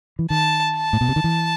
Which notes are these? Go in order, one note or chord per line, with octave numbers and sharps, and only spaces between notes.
E3
D#3 A5
A5
A2
B2
C3
D#3
E3